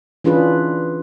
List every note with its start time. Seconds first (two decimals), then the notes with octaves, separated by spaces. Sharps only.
0.24 E3 C#4 D4 F4 G#4 B4